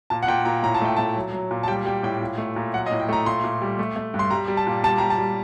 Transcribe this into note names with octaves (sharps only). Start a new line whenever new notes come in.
A#2 A5
F#5
A#2 G5
A#2 A#5
A2 A#5
A5
A3 G5
A3 A5
F#3
F#3
A#2
A5
G3 G5
G3 G5
A2 G5
A#2
A3
A#2
F#3 F#5
D#5
A2
G5
A3 A#5
A#2 C6
A#2
G3
A3
A3
G2
C6
G3 A#5
G3
A5
A#2
G3 A5
G3 A#5
A5
G3